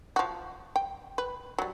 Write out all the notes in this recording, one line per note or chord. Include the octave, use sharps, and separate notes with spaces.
F3 F#4
G5
B4
F#3 G3